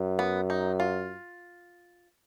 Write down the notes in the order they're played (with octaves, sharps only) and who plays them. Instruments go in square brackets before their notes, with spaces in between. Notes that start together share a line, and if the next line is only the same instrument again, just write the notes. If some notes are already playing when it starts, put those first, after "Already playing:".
Already playing: [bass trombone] F#2
[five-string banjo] B3
D#4
F4